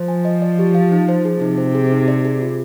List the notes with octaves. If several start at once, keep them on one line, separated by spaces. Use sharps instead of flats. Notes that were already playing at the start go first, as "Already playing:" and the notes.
Already playing: F3 C5
G#5
D#5
D5
G4
F5
D#4
C5
G#4
C3 D#4
C5
G#4
D#4
D5
G#4
F4